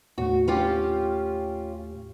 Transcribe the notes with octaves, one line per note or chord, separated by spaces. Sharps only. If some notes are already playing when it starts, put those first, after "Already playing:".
D#2 A2 A3 F#4
C#4 F4 G4